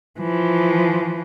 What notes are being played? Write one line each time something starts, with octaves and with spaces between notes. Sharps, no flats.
E3 F3